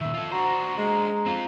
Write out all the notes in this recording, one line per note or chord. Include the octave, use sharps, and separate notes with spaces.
A#2 D#3 E5
F4 A4
D4 F#4 C5 A#5
G#3
C4 F4